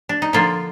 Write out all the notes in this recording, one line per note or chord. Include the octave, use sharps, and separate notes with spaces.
D4
D#4
D3 F3 A#3 D4 F4